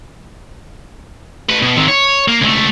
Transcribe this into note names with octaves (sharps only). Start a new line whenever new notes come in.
A2 B4
B2
D#3 C4
C#5
A#3
C#2 A3